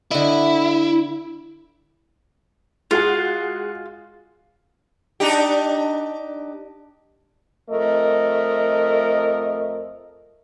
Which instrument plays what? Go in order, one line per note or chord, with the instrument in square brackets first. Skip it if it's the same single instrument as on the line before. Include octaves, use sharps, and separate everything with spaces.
[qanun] D3 D#5 [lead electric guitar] E4
[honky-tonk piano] G#3 F#4 G#4 [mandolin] F4
[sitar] D4 D#4 G4
[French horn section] F2 A3 A#4 D#5